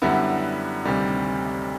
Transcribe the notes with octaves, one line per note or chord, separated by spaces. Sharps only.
F#2 D3 G3 B3 E4
D2 C3 D#3 G3